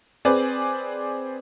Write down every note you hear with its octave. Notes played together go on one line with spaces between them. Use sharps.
C4 G#4 B4 D5